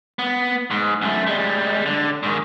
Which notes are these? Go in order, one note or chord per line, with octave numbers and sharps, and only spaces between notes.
B3
G#2
F#2 A3
G3 G#3
D3
G#2 D#3